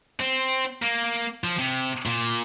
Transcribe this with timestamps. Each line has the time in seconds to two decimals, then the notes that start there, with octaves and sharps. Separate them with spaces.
0.20 C4
0.82 A#3
1.44 F3
1.59 C3
2.06 A#2